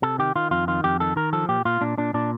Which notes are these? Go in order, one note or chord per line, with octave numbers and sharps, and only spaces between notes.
C3 A4
D#3 G4
D#3 F4
F2 F4
D#3 F4
F2 G4
D#3 A4
D#3 A#4
F3 A4
A#2 G4
A#2 F4
A#2 D4
A#2 D4
A#2 D4